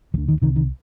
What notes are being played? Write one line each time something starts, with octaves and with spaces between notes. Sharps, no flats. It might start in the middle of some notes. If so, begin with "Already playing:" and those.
D2 D3 F3
D#3
C2 C3 D#3
D#3